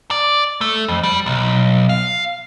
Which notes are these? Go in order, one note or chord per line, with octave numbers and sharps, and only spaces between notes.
D5
A3
F2
G3
B1
F5